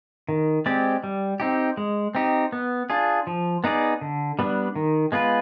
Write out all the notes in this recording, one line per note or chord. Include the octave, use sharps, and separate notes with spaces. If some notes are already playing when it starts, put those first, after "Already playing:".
D#3
G#3 C4 G4 D5
G3
C4 D#4 G4
G#3
C4 D#4 G4
B3
D4 F4 G#4
F3
B3 D#4 G#4 D5
D3
G3 B3 D4
D#3
G#3 B3 F4 B4